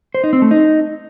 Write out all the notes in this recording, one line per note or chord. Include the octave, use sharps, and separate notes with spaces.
C5
D#4
C4
A3
D#4